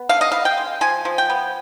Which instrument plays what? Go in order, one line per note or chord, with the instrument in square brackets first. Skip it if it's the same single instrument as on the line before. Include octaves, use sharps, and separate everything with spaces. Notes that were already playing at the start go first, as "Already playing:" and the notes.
Already playing: [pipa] B3
D3 F5
D#5
B3 F5
G5
G#3
F3 G#5
F3
G5
B3